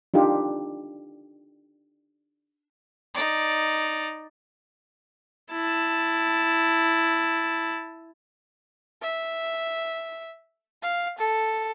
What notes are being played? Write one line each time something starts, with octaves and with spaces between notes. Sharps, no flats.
D4 D#4 F4 G4
D#4 D5
E4 A5
E5
F5
A4